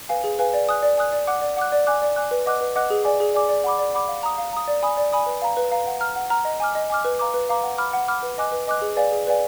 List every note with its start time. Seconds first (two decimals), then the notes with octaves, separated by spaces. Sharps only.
0.09 B4 F5 G#5
0.24 G#4
0.39 B4 F5 G#5
0.54 D5
0.68 G#5 D#6 F#6
0.83 D5
0.98 G#5 D#6 F#6
1.12 D5
1.27 F#5 D6 F#6
1.42 D5
1.57 F#5 D6 F#6
1.72 D5
1.87 G#5 D6 F#6
2.02 D5
2.16 G#5 D6 F#6
2.31 B4
2.46 D#5 F#5 D6 F#6
2.61 B4
2.76 D#5 F#5 D6 F#6
2.90 G#4
3.04 D5 G#5 D6
3.20 G#4
3.34 D5 G#5 D6
3.49 D5
3.64 F#5 B5 D6
3.79 D5
3.94 F#5 B5 D6
4.08 F5
4.23 A#5 D#6
4.38 F5
4.53 A#5 D#6
4.68 D5
4.83 G#5 B5 D#6
4.97 D5
5.12 G#5 B5 D#6
5.26 B4
5.42 F5 A#5
5.57 B4
5.71 F5 A#5
5.87 F#5
6.00 A#5 F6
6.16 F#5
6.30 A#5 F6
6.45 D#5
6.60 G#5 D6 F6
6.75 D#5
6.90 G#5 D6 F6
7.05 B4
7.19 F5 A#5 D6
7.34 B4
7.49 F5 A#5 D6
7.63 F#5
7.78 B5 D6 F6
7.93 F#5
8.08 B5 D6 F6
8.23 B4
8.38 D#5 G#5 D6 F#6
8.52 B4
8.67 D#5 G#5 D6 F#6
8.82 G#4
8.96 B4 D5 F5 G#5
9.12 G#4
9.27 B4 D5 F5 G#5